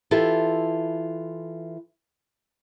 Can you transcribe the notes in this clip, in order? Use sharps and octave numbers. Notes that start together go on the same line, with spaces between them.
E3 E4 F4 G4 A4